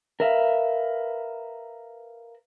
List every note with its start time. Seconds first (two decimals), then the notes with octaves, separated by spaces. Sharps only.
0.20 A#4 B4 E5 F5